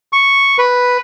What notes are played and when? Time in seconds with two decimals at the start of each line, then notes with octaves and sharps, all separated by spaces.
0.13 C#6
0.58 B4